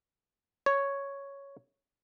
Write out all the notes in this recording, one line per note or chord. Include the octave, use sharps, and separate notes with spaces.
C#5